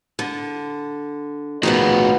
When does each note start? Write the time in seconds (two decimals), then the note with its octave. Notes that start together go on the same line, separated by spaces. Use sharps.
0.19 D3
1.63 D#3 F3 A3 B3 F#4 G#4